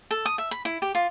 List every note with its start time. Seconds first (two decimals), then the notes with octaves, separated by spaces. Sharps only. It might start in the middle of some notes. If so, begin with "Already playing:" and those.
0.11 A4
0.26 D#6
0.38 E5
0.51 B5
0.65 E4
0.82 G4
0.95 F4